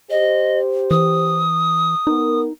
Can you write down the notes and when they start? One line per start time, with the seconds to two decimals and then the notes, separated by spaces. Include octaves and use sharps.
0.10 G4 C5 D#5
0.91 E3 D#6
2.07 B3 D#4 A#4